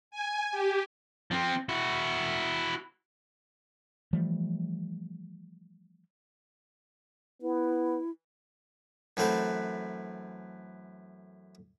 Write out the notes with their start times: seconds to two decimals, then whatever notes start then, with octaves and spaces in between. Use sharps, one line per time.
0.11 G#5
0.52 G4
1.31 F3 C4
1.69 E4 F#4
4.13 E3 F3 G3 A3
7.42 B3 E4
9.17 F#2 E3 A3 C4 B4